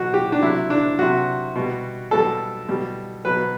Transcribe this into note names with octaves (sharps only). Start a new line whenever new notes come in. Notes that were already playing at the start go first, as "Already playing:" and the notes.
Already playing: B2 F#3 F#4
G4
D4
C3 F#3 E4
D4
C3 F#3 F#4
B2 G3
B2 G3 A4
B2 G3
B2 F#3 B4